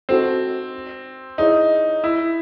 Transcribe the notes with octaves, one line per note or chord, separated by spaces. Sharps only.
C4 D#4 F#4 A4 C5
D#4 E4 G#4 C#5 E5
E4